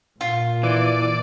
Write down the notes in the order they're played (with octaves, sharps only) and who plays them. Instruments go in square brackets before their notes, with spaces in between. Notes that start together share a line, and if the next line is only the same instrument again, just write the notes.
[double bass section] A#2 [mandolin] F4
[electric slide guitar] E3 [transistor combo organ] D5